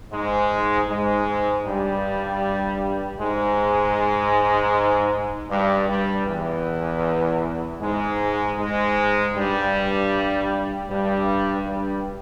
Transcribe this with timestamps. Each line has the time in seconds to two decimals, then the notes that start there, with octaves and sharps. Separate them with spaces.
0.11 G#2 G#3
0.87 G#2 G#3
1.65 G2 G3
3.19 G#2 G#3
5.49 G2 G3
5.88 G2 G3
6.26 E2 E3
7.80 G#2 G#3
8.57 G#2 G#3
9.33 G2 G3
10.88 G2 G3
11.65 G2 G3